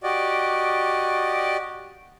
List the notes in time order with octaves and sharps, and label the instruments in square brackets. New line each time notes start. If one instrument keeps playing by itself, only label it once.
[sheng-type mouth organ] F#4 G4 D5 D#5